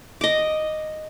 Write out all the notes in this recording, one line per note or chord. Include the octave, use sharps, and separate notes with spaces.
D#5 D6